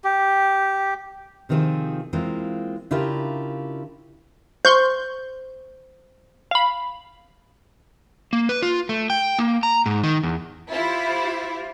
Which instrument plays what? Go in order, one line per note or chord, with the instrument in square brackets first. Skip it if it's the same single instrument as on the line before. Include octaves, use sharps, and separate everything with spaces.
[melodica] G4
[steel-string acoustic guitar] C3 D#3 F3 C4 F4 G#4
E3 G#3 A#3 C4 F4
C#3 D4 E4 F4 G4 A#4
[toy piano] C5 [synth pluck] C6 C#6 G6
[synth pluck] F5 B5
[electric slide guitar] A#3
B4
F4
A3
G5
A#3
A#5
G#2
D#3
E2
[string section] E4 [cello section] F4 G4 C5